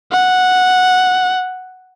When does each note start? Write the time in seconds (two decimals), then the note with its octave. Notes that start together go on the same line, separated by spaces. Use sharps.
0.11 F#5